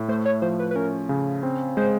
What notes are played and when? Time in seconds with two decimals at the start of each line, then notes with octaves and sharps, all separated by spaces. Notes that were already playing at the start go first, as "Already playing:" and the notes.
Already playing: A2
0.08 A3 C5
0.25 C#5
0.42 F3 C5
0.59 B4
0.71 B4
0.76 C#4 A#4
1.09 C#3
1.43 C4
1.77 G#3 C5